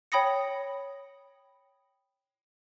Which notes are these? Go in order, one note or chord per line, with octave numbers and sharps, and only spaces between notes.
C#5 G5 B5 D#6 A#6 C#7